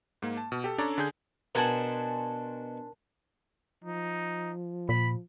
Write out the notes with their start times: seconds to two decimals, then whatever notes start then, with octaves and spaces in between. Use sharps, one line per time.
0.22 G#2 A#3
0.37 A5
0.52 B2
0.64 G4 A4
0.78 C#4 D4 A4 C#5 D5 A#5
0.98 D3 G#4 G6
1.55 B2 D4 A#4 C5 F#5 G#5 A5
3.84 F3 D#4
4.89 A#2 B5